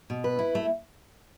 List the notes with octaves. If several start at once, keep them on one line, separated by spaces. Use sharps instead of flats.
B2
B4
E4
A3